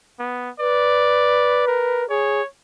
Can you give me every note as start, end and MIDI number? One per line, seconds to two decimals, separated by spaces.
0.19 0.50 59
0.59 2.08 71
0.59 1.64 74
1.67 2.03 70
2.09 2.41 68
2.09 2.47 73